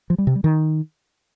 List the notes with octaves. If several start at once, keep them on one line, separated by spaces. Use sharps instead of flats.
F3
G3
C3
G3
D#3